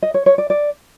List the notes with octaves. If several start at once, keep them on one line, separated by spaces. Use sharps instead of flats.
D#5
C#5
C#5
D5
D5